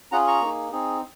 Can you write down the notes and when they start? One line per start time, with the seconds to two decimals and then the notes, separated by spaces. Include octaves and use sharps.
0.12 C#4 F4 G#4 F#5 A#5
0.27 A#5 C#6
0.41 A#3 D#4 G#4
0.72 C4 D#4 G#4